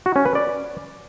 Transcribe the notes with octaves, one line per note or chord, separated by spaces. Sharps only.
F#4
C#4
B4
D5